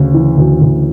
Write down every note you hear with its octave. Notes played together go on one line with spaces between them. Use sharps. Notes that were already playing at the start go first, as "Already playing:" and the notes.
Already playing: D2 C#3
E3
D2
D2